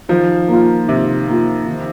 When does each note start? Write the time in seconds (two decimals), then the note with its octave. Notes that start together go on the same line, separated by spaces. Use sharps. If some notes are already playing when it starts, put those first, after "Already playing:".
0.09 D#3 F3
0.48 A#3 F4
0.87 C3 D#3
1.27 A#3 F4
1.67 D#3